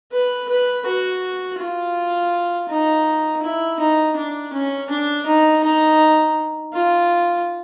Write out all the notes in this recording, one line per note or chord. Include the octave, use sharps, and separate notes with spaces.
B4
B4
F#4
F4
D#4
E4
D#4
D4
C#4
D4
D#4
D#4
F4